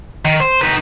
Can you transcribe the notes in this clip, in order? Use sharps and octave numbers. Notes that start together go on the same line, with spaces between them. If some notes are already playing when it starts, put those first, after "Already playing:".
D#3
C5
D#4 B4